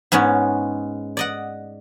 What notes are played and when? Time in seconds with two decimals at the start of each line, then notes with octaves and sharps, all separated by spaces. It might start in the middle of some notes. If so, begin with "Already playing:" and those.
0.12 G#2 G#3 B3 C#4
1.17 D5 D#5 F#5